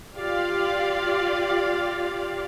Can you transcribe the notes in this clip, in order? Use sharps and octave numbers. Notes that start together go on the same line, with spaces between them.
F4 G4 D5 F5